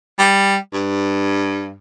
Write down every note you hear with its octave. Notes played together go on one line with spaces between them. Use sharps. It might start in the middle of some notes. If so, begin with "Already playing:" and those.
G3
G2